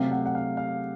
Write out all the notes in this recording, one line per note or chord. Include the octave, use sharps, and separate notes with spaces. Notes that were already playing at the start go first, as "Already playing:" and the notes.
Already playing: C3 F#3 A3 F5
F#5
F#5
F5
F5